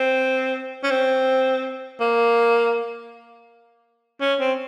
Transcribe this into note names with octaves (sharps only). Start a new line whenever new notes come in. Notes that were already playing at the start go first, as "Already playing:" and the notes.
Already playing: C4
C#4
C4
A#3
C#4
C4